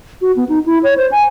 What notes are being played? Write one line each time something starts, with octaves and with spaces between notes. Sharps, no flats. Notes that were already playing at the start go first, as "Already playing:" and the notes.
F#4
B3
D#4
E4
C#5
C5
G#5